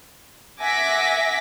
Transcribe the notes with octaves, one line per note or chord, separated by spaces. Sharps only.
E5 F#5 G#5 D6 A#6 B6